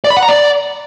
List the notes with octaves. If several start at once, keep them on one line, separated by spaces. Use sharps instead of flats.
D5
B5
F#5
A#5
D5